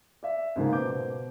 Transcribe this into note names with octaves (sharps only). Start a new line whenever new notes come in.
D5 E5
G#2 C#3 F3 A#3
B2 C5 D6 G6